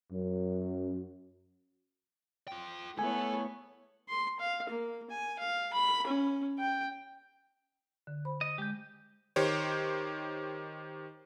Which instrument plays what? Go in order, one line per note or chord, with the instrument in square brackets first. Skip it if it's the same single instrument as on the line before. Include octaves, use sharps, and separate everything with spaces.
[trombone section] F#2
[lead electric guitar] F4 G5
[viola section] A3 E4 C#5 [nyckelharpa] B3 [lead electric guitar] A4 [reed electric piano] G#5
[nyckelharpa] C6
F5
A#3
G#5
F5
B5
C#4
G5
[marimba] D3
C5 B5
[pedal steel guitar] D#5
[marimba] G#3 [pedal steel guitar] G4 G6
[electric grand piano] D#3 G4 C5 C#5